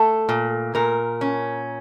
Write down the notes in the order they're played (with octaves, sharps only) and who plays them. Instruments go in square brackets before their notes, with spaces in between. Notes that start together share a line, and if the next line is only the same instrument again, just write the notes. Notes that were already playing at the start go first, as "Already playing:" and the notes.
Already playing: [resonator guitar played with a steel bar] A3 A4
A#2
A#2 A#4
C#4